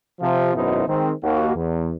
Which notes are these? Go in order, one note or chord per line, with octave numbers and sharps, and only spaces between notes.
C3 F3 F4
G#1 F#2 B2 D#4 E4 C5
D#3 G#3 C4
D#2 A#3 F#4
E2